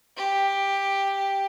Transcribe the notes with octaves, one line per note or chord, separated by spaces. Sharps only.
G4